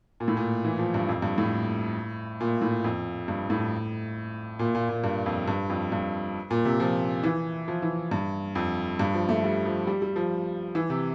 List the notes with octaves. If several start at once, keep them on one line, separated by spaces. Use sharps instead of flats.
A#2
A2
A#2
E3
F3
G2
F2
G2
A2
A#2
A2
F2
G2
A2
A#2
A#2
A#2
G2
F2
G2
F2
G2
A#2
C3
F3
E3
F3
E3
G2
F2
G2
F3
A3
G3
F3
G3
G3
F3
E3
C3